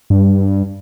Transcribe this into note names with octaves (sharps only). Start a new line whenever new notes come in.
G2